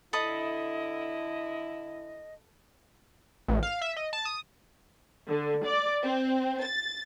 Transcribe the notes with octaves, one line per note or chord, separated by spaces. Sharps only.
D3 E4 A4 D#5 B5 D#6
A1
F5
E5
D#5
A5
D#6
D3
D5
C4
A6